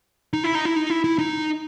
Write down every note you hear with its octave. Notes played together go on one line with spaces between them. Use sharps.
D#4
E4
D#4
E4
D#4
E4
E4
D#4